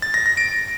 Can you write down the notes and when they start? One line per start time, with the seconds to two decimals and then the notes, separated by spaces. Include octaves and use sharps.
0.02 A6
0.14 A#6
0.26 A#6
0.37 D7